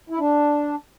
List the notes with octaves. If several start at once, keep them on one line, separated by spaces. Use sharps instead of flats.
E4
D4